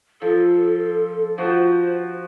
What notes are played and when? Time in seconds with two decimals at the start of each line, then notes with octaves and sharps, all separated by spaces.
0.22 F3 A4
1.38 F3 F#4 C5